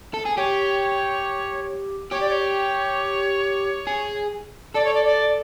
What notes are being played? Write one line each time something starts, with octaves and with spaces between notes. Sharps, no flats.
A4
G#4
G4 C#5
G4 C#5
D5
C#5
G#4
A4 D5
C#5
D5
D5